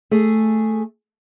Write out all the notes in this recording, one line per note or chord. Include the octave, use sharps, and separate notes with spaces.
A3 G#4